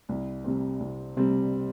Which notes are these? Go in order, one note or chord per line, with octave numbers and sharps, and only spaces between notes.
C2
C3 G3 C4
C2
C3 G3 C4